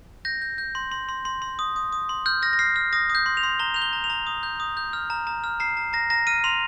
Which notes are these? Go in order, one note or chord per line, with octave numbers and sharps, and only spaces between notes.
G6 A#6
G6
G6
C6
C6
C6
C6
C6
D#6
D#6
D#6
C6
F6 G6
F6 A#6
A#6
F6 C7
F6
D#6 A#6
D#6
G6
C6
F7
C6
A#5 G7
G6 F7
G7
A#5
F7
A#5
D#6
G6
D#6
G6
F6
A#5
A#5
F6
A#5 C7
A#5
A#5 A#6
A#5 A#6
F6 D#7
C6 F7